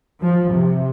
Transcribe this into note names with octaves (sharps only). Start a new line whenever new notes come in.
F3
C3